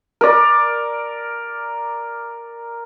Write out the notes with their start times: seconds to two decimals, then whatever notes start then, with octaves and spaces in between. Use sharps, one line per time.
0.21 A#4 D5